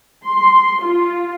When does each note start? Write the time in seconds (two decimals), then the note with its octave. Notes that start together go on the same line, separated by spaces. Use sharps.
0.25 C6
0.82 F4